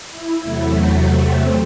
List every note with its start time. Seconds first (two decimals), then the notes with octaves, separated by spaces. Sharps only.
0.10 E4
0.43 E2 C3 F#3 A3 E4
0.76 F#4
1.08 C4